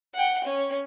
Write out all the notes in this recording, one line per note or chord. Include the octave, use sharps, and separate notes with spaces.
F#5 G5
C#4